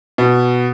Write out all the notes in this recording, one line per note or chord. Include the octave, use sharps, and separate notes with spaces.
B2